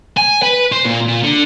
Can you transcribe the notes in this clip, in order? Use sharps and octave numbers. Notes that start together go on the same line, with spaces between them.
G#5
B4
C5
A#2
A#2
D3